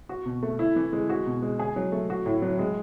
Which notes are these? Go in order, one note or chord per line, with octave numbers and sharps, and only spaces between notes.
F#4
B2
A3
E4
E3
G#3
F#4
B2
G#3
G#4
F#3
A3
F#4
A2
F#3
G#3